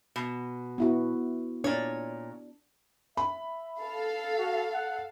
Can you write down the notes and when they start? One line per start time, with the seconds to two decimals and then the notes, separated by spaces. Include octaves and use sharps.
0.16 B2
0.78 B3 E4 F#4
1.64 A#2 D4 C#5
3.17 E5 B5
3.81 A4 F5
4.38 F#4
4.74 F#5